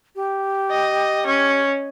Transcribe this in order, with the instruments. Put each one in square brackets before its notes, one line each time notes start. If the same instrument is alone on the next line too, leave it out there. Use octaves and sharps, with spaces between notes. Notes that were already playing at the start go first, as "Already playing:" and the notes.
[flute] G4
[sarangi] D#5
C#4